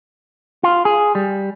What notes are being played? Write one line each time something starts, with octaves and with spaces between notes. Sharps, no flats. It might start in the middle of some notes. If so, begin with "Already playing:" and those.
F4
G#4
G3